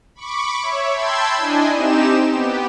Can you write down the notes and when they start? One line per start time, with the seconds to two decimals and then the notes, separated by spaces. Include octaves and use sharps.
0.15 B5 C#6 D6
0.61 C#5 E5
0.91 G5 A5 B5 C6 E6 G#6
1.37 D4 E4 D#5 G#5
1.73 C4 D#4 G4 E7
2.29 B3 G4